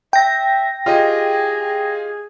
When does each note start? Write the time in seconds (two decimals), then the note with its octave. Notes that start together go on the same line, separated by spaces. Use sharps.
0.13 E5 G5 A#6
0.86 F4 G4 G#4 D#5